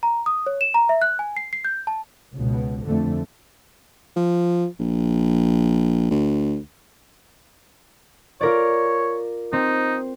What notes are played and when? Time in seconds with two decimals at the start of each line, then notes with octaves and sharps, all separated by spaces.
0.03 A#5
0.26 D#6
0.47 C#5
0.61 E7
0.74 A#5
0.89 E5
1.02 F#6
1.19 G#5
1.37 C7
1.53 C7
1.65 G6
1.87 A5
2.35 C#2 B2
2.85 F2 D3 A3
4.16 F3
4.79 A#1
6.11 D2
8.41 F4 A#4 C#5 D5
9.53 C4 D#4